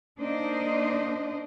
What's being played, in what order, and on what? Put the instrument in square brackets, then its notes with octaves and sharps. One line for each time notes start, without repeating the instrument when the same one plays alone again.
[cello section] A#3 D4 D#4 C5 D#5